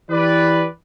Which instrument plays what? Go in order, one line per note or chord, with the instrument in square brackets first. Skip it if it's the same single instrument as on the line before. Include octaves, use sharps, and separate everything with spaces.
[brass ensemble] E3 G4 B4 D5